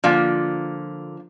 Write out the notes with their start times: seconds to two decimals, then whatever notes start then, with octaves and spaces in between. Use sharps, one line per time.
0.04 D3 F3 A#3 F4